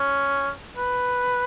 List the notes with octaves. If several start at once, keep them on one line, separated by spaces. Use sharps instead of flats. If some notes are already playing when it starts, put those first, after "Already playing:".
Already playing: C#4
B4